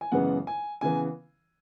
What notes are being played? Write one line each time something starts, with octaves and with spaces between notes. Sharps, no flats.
G#5
F#2 C#3 E3 G#3 B3 F#5
G#5
C#3 E3 B3 G#5